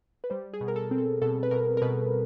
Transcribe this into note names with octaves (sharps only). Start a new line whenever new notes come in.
B4
G3 C5
G#4
B2
A#4
A4
C4
A4
B2 A4
B4
B2 A#4
A#4
B2 B4